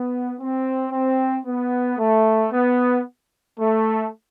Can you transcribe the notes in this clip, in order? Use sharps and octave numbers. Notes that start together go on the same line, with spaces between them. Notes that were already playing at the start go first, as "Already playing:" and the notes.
Already playing: B3
C4
C4
B3
A3
B3
A3